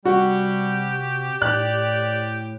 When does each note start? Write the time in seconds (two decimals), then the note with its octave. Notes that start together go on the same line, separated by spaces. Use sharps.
0.05 C3 G3 F#4 G4
1.42 A2 D5 F#6